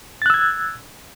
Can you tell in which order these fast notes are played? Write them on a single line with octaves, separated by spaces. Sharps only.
A6 F#6 E6 G#6